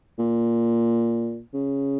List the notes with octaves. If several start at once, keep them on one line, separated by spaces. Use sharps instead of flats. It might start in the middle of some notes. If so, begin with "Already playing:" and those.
A#2
C#3